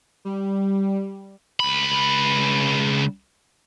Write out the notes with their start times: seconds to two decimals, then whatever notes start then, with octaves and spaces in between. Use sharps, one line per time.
0.25 G3
1.60 C#2 B5